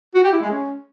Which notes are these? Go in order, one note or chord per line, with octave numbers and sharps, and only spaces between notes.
F#4
G4
E4
G#3
C#4